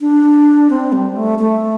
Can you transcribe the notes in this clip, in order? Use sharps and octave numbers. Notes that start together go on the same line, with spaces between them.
D4
C4
G3
A3
A3